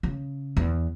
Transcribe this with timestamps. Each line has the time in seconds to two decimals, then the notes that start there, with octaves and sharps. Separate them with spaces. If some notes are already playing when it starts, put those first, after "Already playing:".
0.03 C#3
0.57 E2